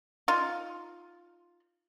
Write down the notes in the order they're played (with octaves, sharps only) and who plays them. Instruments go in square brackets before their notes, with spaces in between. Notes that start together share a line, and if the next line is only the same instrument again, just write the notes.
[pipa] D#4 F4